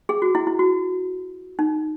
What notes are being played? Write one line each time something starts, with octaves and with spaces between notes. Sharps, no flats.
G#4
F#4
E4
E4
F#4
D#4